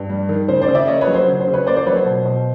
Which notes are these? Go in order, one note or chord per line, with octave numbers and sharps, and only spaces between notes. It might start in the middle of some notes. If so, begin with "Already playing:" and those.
Already playing: G2
G3
D#3
C#3 C5
C5 D5
C#3
D5 E5
A#3 C#5 D#5
B4 C#5
F#3
C5
C#3
C5
C#3
B4 C#5
A#3 C5 D5
C5 D5
F#3 B4 C#5
C5
B2
B2